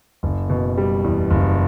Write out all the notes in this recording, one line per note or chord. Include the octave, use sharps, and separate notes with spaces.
F#1
B2
G3
E2
F#1